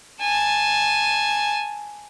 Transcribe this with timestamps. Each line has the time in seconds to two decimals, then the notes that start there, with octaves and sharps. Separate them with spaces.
0.21 G#5 A5